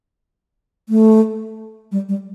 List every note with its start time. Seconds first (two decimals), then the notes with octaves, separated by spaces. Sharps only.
0.89 A3
1.92 G3
2.09 G3